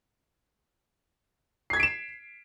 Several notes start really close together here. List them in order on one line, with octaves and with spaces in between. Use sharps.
C7 G#6 B6 D7 E7